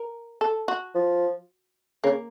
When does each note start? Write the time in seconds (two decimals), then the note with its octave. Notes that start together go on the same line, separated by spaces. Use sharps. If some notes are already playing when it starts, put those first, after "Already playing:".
Already playing: A#4
0.41 A4
0.68 F#4
0.95 F3
2.04 C#3 A#3